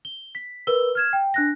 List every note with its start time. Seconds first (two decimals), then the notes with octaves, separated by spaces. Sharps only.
0.05 G7
0.35 B6
0.67 A#4 B4 E6 G7
0.95 F6 G#6 E7
1.13 G5
1.34 D4 F#6 A#6